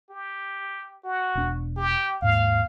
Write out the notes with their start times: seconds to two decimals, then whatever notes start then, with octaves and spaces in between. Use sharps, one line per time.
0.10 G4
1.04 F#4
1.35 E1 D4
1.77 G4
2.22 D#2 G#2 F5